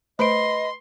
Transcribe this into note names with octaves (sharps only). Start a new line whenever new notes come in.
A3 B4 C5 D#5 B5 C6 D7